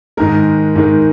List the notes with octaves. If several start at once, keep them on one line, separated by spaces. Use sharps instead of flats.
G#2 D#3 G#3 A#4
G#2 D#3 G#3